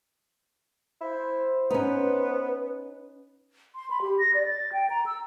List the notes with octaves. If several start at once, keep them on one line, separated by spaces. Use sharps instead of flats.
E4 C5
B3 C#4 D#4 B4
C6
B5
G4
A#6
D5
A6
G5
A#5
E6